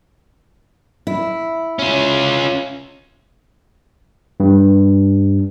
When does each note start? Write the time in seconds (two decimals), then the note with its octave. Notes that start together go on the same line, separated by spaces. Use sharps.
1.07 E4
1.79 C#4 F4
4.40 G2